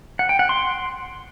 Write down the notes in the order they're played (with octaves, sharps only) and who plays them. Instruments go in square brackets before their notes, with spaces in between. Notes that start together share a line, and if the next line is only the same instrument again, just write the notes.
[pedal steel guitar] F#5
G5
F#5
C6